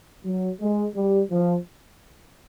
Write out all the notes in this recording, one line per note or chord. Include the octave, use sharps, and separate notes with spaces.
F#3
G#3
G3
F3